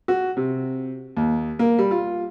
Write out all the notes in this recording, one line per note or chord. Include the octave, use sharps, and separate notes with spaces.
F#4
C3
D#2
A#3
G3
F4